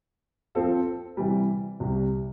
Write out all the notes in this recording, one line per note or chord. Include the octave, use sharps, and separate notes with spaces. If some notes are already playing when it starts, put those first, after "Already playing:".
F3 C4 F4 A4
C3 E3 G3
C2 C3 G3